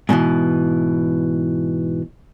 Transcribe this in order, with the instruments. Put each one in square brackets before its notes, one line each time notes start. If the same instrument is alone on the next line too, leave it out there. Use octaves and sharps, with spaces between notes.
[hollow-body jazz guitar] G#2 B2 D#3 E3